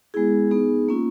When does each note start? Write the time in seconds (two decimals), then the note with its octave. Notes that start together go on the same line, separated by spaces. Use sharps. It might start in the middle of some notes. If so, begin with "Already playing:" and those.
0.14 G#3 B3 E4 G#4
0.51 B3 D#4 G#4
0.88 A#3 C#4 F4